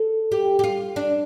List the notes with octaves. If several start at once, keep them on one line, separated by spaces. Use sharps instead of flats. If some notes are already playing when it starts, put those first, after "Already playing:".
Already playing: A4
G4
G4
F4
D4